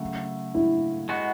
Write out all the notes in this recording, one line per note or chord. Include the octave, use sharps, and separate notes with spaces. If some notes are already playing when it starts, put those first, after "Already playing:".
Already playing: C#3 F#3 A3
E4
G#3 B3 F#4